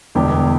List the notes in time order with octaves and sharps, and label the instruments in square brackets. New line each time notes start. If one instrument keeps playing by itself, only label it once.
[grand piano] E1 E2 D3 G3 G4